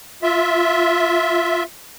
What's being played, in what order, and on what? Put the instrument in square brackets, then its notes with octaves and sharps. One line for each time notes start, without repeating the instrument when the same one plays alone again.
[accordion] F4 E5